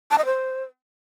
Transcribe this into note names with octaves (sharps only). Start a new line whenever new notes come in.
A5
D#5
C5